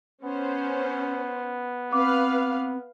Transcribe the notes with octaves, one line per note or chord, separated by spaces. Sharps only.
B3 C#4 C5
C4 B4 F5 D6